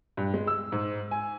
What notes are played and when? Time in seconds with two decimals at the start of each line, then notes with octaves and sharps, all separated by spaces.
0.17 G2
0.34 G#3
0.47 E6
0.72 G#2
1.11 G#5